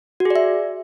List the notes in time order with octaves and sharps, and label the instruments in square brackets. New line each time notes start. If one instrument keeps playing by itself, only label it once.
[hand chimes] F#4
G#4
D5
E5